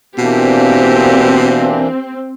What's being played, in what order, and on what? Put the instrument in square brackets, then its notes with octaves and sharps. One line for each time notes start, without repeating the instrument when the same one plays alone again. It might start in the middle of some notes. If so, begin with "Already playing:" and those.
[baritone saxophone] B2 [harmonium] E3 A#3 D4 [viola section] C4 [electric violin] G4